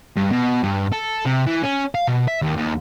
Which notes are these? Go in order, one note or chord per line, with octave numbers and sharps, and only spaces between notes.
G2
B2
G2
A4
C3
E3
C#4
F5
B2
E5
D#2
D#2